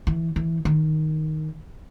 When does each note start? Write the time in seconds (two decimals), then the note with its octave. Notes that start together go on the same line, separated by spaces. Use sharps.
0.07 E3
0.36 E3
0.65 D#3